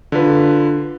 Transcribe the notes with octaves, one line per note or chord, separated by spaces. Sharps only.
D3 F4 B4